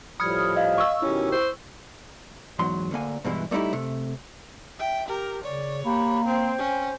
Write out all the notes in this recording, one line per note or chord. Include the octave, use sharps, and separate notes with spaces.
A2 F3 G3 B5 D#6 F6 G#6 C#7
D#5 F5
C#6 E6
B2 D#3 C#4 E4 G4
C5
E2 G#2 F#3 C6
D2 D3 A#3 G#5
G2 B2 E3 G#3 E4
G3 A3 B3 D#4 E4 G4
C3 A3
E5 G5
G4 A#4
C#3 C#5 D5
A#3 G4 B5
C4 C5 G5
C#4